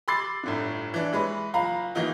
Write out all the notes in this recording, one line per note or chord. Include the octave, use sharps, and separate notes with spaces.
B5 C6 D6 E6 A6 C7
G1 A2 D3
E3 D4
E3 G#3 B4 C#5
F#1 F4 F5 A#5 B5
D#3 E3 A#3 D#4 F4